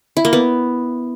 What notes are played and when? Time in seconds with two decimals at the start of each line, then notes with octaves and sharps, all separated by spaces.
0.17 E4
0.25 A#3
0.33 B3